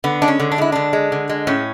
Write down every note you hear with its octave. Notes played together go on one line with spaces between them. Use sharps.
D3 B3
G#3 D4
C#4
D3
D4
G#3 E4
D3 D4
G#3
D3
G#3
A2 C#4